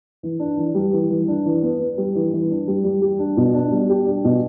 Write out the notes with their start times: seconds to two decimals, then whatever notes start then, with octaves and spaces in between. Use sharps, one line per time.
0.23 E3
0.40 D4
0.57 E3
0.75 G3
0.93 E3
1.10 E3
1.28 D4
1.46 E3
1.62 B3
1.80 B3
1.98 G3
2.15 E3
2.33 E3
2.50 D4
2.68 G3
2.84 G3
3.02 G4
3.19 D4
3.37 B2
3.54 D4
3.72 G3
3.89 G4
4.06 D4
4.25 B2